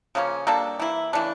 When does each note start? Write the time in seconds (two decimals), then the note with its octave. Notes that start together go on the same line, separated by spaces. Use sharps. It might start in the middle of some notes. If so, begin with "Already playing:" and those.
0.15 C#3 F3 A#3 C#4
0.47 G3 A#3 D4 A4
0.79 E3 A#3 E4
1.13 C#3 E3 A3 D4